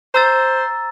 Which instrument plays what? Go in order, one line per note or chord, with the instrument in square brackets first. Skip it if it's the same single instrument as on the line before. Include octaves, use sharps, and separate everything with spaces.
[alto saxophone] C5 [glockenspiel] A#5 E6 A6